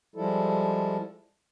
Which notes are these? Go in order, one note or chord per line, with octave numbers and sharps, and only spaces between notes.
F3 G3 G#3 E4 A4